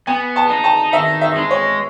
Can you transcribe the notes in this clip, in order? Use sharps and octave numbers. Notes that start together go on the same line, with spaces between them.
B3 G#5
A5
D#4
A5
D#3 E5
E5
G#3
C#5